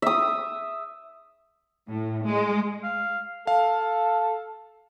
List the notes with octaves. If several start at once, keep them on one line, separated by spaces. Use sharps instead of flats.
E5 D#6
A2
G#3
F5
A4 F5